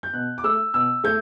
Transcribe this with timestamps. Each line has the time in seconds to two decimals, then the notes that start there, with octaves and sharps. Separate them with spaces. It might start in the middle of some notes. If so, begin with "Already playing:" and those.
0.03 G6
0.13 B2 F#6
0.38 D6
0.44 A3 E6
0.74 B2 E6
1.04 A3 G6